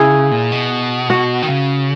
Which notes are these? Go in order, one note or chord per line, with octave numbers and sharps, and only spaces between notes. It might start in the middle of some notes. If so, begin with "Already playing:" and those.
Already playing: C#3 E4 G#4
A#2
B2
F#4
D#3
C#3